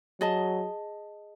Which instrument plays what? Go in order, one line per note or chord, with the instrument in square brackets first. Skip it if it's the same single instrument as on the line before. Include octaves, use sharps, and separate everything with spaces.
[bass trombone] F#3 [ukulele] G#4 D#5 A5